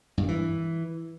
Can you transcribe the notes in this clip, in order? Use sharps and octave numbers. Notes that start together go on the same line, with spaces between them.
G2
D#3
E3